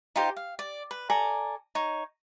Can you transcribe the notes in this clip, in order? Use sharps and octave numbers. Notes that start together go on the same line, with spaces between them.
D#4 F4 G4 C5
F5
D5
B4
A4 D5 G#5 A#5
D#4 C#5